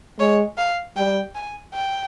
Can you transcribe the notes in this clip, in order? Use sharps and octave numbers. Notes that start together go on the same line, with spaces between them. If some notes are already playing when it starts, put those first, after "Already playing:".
G#3 C#5
F5
G3 G5
G#5
G5